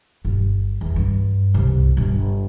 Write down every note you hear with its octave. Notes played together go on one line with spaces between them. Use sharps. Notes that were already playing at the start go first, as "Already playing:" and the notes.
G1
E2
G2
C2
G1